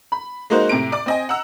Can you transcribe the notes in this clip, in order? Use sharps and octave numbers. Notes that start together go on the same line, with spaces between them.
B5
G#3 A#3 D#4 F#4 C5
A2 C3 A#5 D7
D5 D6
C4 D#5 G#5
F#5 A#5 E6